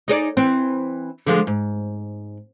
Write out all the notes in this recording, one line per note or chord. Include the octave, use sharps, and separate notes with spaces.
D#4 G#4 D5
E3 C4
D3 F3 G#3
G#2